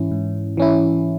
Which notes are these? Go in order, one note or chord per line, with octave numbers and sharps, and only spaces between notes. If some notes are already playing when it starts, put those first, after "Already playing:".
Already playing: G#2 E3 C#4 E4
G#2
E3 C#4 E4